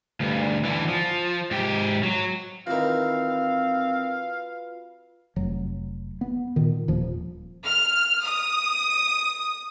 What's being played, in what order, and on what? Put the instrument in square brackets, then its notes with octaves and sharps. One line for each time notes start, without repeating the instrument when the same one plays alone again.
[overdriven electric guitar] D2 G2
D3 E3
F3
G#2 G4
F#3
[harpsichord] D#3 E3 [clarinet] C4 [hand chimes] F4 F#4 B4 [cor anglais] F5
[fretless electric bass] F1 F#3
B3
A#2 D#3
D#1 A#2 F3
[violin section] F6
D#6